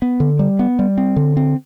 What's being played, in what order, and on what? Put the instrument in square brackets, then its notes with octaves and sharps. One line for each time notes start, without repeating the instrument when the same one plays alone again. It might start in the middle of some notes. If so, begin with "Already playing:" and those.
[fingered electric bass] B3
D3
G3
B3
G3
C4
D3
C4